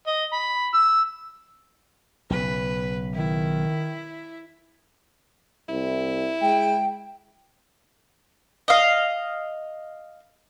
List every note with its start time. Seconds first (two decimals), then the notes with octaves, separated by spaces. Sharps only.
0.07 D#5
0.33 B5
0.74 E6
2.30 B1 C#3 B4
3.15 D#3 E4
5.69 C2 E4
6.42 G#3 G5
8.68 D#5 F5